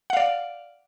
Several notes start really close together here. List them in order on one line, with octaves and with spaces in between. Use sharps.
F#5 F5 D5